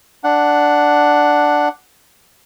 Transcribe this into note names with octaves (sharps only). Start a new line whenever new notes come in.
D4 F#5